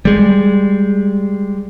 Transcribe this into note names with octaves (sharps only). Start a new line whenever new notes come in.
G3 G#3